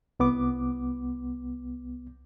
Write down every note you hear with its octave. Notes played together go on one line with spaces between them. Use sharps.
C2 B3 D6